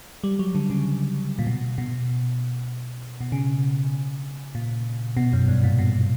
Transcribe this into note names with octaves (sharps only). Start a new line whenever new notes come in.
G3
F#3
D3
C#3
A#2
B2
B2
B2
C#3
A#2
B2
F#2
G2
A#2
B2